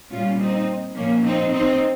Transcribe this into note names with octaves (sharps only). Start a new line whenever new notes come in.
A#2 G3 C#4 F4
C4 D#4
A#2 F3 A#3 C#4
C4 D#4
C4 D#4